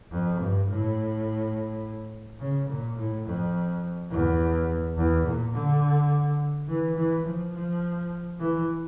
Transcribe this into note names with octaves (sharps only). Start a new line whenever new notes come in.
F2
G2
A2
C#3
A#2
A2
F2
E2
E2
A#2
D3
E3
E3
F3
F3
E3